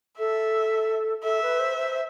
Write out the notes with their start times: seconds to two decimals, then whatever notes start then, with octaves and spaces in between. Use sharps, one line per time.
0.19 A4 E5
1.24 A4 E5
1.42 B4
1.59 C5
1.77 C5